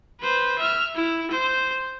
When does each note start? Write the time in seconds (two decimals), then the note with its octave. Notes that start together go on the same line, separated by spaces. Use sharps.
0.21 B4 C5
0.59 E5 F6
0.95 E4
1.31 C5